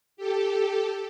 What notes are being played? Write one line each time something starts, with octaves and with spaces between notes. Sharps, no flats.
G4 A4